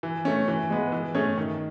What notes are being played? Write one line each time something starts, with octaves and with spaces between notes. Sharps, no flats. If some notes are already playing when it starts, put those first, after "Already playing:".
E3
A3 C#4
E3
G#3 B3
E3
A3 C#4 G#4 C#5
D#3